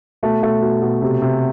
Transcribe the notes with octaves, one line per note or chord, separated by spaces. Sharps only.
B2 A3
B2 A3
B2
B2
C3
C3